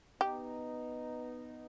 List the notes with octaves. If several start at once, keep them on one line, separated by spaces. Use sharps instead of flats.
B3 D#4 G4